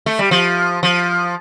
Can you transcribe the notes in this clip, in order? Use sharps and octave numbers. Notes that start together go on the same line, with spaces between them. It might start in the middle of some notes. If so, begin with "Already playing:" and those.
A3
G3
F3
F3